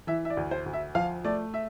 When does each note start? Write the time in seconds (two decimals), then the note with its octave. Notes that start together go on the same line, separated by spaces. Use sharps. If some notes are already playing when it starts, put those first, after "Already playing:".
0.07 E3 E5
0.25 E5
0.30 D5
0.37 D2
0.51 C5
0.66 D2
0.73 E5
0.95 F3 F5
1.25 A3 D5
1.54 E5